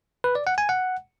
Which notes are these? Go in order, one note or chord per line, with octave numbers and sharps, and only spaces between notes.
B4
D5
F#5
G#5
F#5